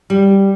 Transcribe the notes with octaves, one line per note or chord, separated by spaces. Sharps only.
G3